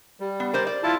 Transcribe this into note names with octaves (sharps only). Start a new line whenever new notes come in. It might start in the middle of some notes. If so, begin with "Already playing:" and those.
G3
B3
A#4 C5 D5
D5
E4 F4 A5